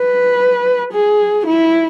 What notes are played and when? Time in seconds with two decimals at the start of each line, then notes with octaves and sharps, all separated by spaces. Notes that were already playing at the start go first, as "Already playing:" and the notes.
Already playing: B4
0.93 G#4
1.46 E4